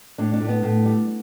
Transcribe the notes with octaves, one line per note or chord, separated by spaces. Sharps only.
A2 D4
D4
A2
B3
A2
G3